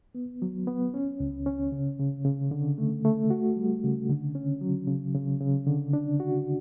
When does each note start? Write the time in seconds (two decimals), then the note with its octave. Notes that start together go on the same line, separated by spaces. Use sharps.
0.15 B3
0.42 F#3
0.67 B3
0.94 C#4
1.20 C#2
1.46 C#4
1.72 C#3
1.99 C#3
2.25 C#3
2.51 D3
2.78 A3
3.05 A3
3.30 F#4
3.57 G3
3.84 C#3
4.09 D3
4.35 C#4
4.61 F#3
4.87 C#3
5.15 C#3
5.40 C#3
5.66 D3
5.93 D4
6.20 F#4